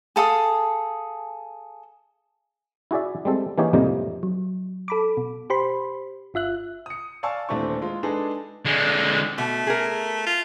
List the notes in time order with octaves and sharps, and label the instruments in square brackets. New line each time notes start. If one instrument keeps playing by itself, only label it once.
[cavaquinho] G#4 A4 F5 D#6
[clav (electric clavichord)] E4 F#4 G#4 D5 E5
G3 G#3 C4 A4
E3 A#3 D#4 G4 G#4 C#5
F2 A2 C3 G3 A#3 D#4
[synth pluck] F#3
A4 B5 D6
B2
G4 C5 B5 C6
G1 F4 E5 F#6
[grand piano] D#6 C#7
D5 F5 G#5 A5 C#6 E6
D#1 E3 A3 C4 D4 C#6
G#3 F4
G#3 D4 D#4 G#4 A4 B4
[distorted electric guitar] D3 G#3
[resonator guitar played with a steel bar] B2 [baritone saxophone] A3
[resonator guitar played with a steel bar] G#4 A#4
[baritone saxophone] F4